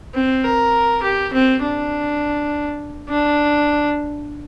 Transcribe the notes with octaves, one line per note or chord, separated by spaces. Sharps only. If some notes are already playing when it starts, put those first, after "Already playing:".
C4
A#4
G4
C4
D4
D4